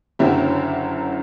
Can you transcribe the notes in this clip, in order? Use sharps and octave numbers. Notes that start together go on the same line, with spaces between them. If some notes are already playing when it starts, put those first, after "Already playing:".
F#1 F#2 D3 F#3 E4 G4